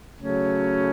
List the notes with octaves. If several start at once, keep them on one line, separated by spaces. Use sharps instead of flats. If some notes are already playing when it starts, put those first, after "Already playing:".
C#3 F#3 A3 C#4